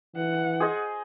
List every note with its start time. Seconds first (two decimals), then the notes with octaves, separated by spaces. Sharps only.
0.16 E3 F#5
0.60 G#4 C5 D#5